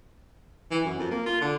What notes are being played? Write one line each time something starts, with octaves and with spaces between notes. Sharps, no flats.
E3
F#2
F2
A#3
F4
D3